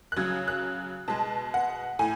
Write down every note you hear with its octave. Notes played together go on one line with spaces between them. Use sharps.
F#6
C#3 F#3 G#6
F#6
B2 G#3 A5
F#5
A2 G#5